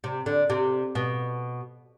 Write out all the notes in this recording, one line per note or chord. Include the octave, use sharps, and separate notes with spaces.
C3
D3
C3
B2